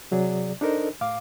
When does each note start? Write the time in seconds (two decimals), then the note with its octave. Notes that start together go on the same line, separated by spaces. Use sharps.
0.11 C3 F#3 G#4 D5
0.61 D4 D#4 A4 A#4 C5 D#5
1.01 A2 F5 D6